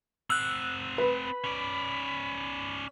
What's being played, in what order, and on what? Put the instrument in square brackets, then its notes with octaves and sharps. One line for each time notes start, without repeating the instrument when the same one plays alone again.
[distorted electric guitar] C4 F#5 [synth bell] E6 F#6
[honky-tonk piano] B4 [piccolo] B5
[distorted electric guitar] C#4 D5